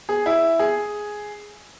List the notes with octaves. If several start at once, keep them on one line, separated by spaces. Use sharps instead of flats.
G#4
E4
G#4